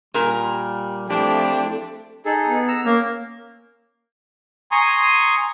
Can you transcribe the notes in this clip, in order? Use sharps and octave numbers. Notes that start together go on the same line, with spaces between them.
A#2 G3 A#4
F3 A3 C4 D4 E4 G4
D#4 G#4 A4
B3
A#5 E6
A#3 C#4
G#5 A#5 C6 C#6 D#6